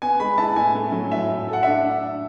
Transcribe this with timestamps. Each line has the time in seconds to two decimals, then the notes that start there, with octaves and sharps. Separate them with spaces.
0.02 B3 G#5
0.20 G#3 B5
0.38 E4 A5
0.56 A2 G#5
0.75 A3
0.92 F#3
1.12 A2 E5
1.29 A2
1.48 A4 F#5
1.63 D4 E5